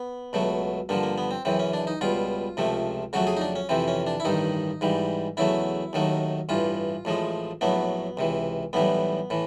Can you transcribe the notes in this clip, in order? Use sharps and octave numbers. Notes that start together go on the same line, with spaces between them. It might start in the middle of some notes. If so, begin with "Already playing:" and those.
Already playing: B3
C#2 B2 F#3 A3
G2 D3 F3 A#3
A#3
B3
C4
F#2 C#3 E3 C4
C#4
D4
D#4
C#2 B2 G3 F4
C#2 C3 F3 A3
F2 C#3 F#3 A3 F#4
G#4
D#4
D4
C#4
F2 C3 E3 C4
C#4
D4
E4
A1 G2 D#3 D#4
G#2 E3 G3
E2 C#3 F#3 A3 E4
D#2 D#3 F#3 A3
A1 G2 E3 F4
A1 A2 F3 G#3
A#1 A2 F#3 A3 B3
C#2 C3 E3
B1 A2 E3 G3 B3
A2 E3